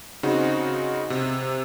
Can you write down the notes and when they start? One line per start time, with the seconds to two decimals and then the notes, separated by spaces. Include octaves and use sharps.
0.23 C#3 C4 D#4 F#4
1.10 C3